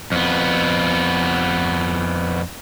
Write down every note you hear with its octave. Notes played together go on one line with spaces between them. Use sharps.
F2 B3